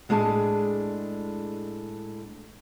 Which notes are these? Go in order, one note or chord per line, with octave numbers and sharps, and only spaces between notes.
A2 G#3 D4 G#4 A5